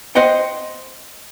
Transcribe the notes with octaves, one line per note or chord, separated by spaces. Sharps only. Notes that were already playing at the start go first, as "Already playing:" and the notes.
C5 D#5 F#5 G5